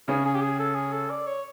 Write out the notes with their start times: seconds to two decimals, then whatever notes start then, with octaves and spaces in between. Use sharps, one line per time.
0.08 C#3 C#4 G#4
0.25 G#4
0.35 G4
0.42 G#4
0.60 A4
0.75 G#4
0.93 A4
1.10 D5
1.27 C#5